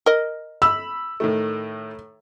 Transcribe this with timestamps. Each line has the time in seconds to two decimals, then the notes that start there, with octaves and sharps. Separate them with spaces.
0.06 A#4 D#5
0.62 B5 E6
1.20 A2 D#3 A3